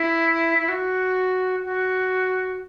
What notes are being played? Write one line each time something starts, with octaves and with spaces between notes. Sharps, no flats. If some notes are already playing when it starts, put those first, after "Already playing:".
Already playing: E4
E4
F#4
F#4